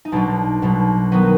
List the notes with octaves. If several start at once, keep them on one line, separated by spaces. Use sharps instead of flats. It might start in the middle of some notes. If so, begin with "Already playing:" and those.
D#4
B1 B2 F#3 D4
B1 B2 F#3
D#3 F#3 B3 D#4